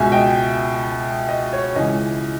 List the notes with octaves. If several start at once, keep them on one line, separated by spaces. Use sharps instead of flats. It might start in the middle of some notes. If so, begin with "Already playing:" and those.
Already playing: C#2 B2 E5 G#5
D#5 G5
D#5
C#5
C#2 C#3 E3 D#5